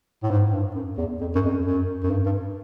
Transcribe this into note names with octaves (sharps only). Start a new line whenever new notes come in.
A2
G#2
G2
F#2
E2
F2
F#2
F2
F#2
F#2
F#2
G2
G2